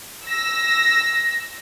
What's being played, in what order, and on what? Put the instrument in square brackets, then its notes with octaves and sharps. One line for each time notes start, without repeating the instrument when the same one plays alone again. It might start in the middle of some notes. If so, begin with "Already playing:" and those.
[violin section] E6 A#6